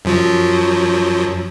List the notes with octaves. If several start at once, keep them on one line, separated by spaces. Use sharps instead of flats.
F#2 F3 F#3